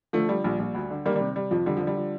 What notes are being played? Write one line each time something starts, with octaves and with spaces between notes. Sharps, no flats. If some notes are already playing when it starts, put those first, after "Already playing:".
D3 F3 A3
F3 G3
A#1 G3
A#1
D2
D3
D#3 G3 A#3
G3
C3
C3 G3
F2 F3
D3 G3
D3 F3
G3
F3